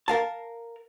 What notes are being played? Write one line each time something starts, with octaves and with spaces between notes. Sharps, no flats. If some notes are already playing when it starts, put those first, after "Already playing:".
A#4 F5 A5